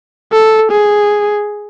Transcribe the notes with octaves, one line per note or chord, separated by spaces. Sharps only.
A4
G#4